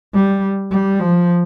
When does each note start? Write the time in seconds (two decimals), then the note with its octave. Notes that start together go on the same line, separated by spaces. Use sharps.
0.14 G3
0.71 G3
1.00 F3